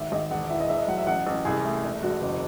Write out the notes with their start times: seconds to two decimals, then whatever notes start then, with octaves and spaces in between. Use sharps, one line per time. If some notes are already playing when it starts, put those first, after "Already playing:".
Already playing: G#1 E5
0.12 G#1 D#5
0.31 E1 F#5
0.50 E3 E5
0.60 D#5
0.69 E1 E5
0.78 D#5
0.88 F#3 F#5
0.98 E5
1.07 A1 F#5
1.27 A1
1.45 C2 G#4
1.65 A3
1.84 E1
2.03 E1 F#4
2.22 F#1